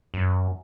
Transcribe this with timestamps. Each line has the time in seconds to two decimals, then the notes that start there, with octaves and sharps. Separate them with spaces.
0.14 F#2